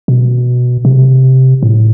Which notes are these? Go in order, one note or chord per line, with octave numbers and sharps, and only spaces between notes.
B2
C3
A2